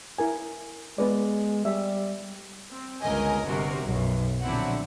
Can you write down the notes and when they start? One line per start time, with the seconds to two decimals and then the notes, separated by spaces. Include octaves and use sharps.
0.19 E4 A#4 G#5
0.98 G#3 B3 B4 D5
1.65 G3 E5
2.71 C4
3.01 G1 C#2 A#4 D#5 G#5
3.45 G1 C3 F#4 A#4
3.86 B1 F#2
4.43 A#1 D3 F#3 C4 E4 F#5